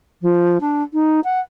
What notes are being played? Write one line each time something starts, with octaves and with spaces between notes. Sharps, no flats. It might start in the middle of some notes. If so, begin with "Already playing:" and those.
F3
D4
D#4
F#5